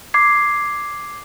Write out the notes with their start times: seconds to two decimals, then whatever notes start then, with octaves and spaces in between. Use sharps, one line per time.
0.14 D6 G#6 C7